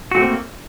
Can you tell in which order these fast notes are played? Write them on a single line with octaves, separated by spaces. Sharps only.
F#4 A3 C4 A#3